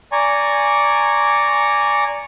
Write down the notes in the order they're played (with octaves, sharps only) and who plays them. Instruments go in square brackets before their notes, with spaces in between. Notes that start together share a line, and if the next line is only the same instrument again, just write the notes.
[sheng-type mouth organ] D5 G#5 A#5 C#6